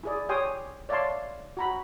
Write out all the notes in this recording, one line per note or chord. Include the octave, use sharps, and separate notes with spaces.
E4 G#4 D5
G4 C#5 G5 G#5 C6 D#6
C#5 D5 E5 F5 A5 C6
F#4 A#5 B5